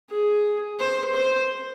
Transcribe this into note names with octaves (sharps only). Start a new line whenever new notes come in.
G#4
C5
C5